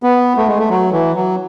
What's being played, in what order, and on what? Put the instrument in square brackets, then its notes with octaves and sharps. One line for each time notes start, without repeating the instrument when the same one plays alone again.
[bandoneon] B3
A3
G#3
A3
F#3
E3
F#3